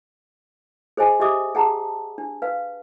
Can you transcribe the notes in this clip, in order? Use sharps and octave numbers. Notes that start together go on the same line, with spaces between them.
G#4 C5 D#5 G#5
G4 D#5 E5 D6 D#6
G#4 F#5 A5 A#5
D4
B4 F5